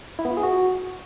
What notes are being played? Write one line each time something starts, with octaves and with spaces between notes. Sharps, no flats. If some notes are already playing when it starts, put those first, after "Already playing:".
E4
B3
F4
G#4
F#4